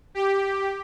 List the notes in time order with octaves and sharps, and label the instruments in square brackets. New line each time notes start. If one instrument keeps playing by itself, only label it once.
[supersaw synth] G4